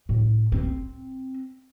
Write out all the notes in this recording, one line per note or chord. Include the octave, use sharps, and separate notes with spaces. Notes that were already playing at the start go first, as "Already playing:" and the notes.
A2
C4